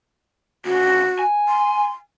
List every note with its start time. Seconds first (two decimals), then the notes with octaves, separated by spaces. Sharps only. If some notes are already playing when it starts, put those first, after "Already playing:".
0.65 D2 C#3 F#4
1.19 G#5
1.48 C6